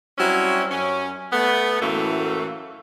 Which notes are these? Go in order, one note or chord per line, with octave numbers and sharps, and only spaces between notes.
F#3 G3 C4 C#4 E4
F#2 C#4
A3 B3
F#2 A2 E3 A3 A#3